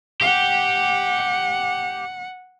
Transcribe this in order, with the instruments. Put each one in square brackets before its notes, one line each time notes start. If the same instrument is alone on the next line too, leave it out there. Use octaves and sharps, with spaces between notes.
[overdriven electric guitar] G4 [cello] F#5